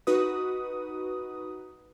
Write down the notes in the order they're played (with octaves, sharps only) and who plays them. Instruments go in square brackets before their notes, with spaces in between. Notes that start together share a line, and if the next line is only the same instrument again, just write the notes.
[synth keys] D#4 F#4 B4 D#6